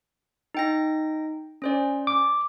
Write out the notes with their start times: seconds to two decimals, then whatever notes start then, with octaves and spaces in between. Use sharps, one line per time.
0.55 D#4 G5 A#6
1.62 C#4 C5 D5
2.07 D6